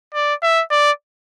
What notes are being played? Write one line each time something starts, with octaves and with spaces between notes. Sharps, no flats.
D5
E5
D5